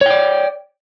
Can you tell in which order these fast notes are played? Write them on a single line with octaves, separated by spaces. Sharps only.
C#5 G5 D5